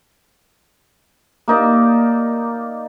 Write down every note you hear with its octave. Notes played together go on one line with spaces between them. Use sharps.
A#3 D#4 D5